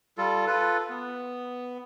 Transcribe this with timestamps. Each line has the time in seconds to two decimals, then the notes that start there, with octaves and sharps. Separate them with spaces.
0.18 G3 F4 A4
0.47 F4 A4 B4
0.90 B3